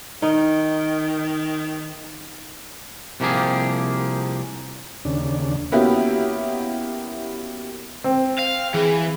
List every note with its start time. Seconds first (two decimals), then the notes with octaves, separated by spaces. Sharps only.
0.22 D#3 D#4
3.20 C2 C3 F3 A#3 G4 G#4
5.05 D#2 C#3 D4
5.72 A#3 B3 C#4 E4 F#4 G4
8.04 C4
8.38 F5
8.74 E3 G#4